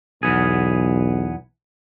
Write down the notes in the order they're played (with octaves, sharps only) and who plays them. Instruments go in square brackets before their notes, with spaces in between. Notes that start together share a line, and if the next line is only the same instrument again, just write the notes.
[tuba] B1 [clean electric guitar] E2 B3 G#4